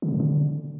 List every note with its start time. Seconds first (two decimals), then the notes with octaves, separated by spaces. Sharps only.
0.02 D3
0.08 B2
0.14 A#2
0.20 D3